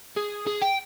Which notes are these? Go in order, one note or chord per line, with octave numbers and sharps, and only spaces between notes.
G#4
G#4
G5